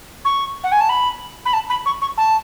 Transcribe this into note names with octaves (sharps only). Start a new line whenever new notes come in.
C#6
F#5
G#5
A5
B5
B5
A5
B5
C#6
C#6
A5